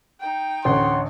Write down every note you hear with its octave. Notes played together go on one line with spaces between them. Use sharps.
D#4 G5
A1 D2 C#5 F#5 C6